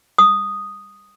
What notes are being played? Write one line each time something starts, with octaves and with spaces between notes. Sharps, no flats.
D#6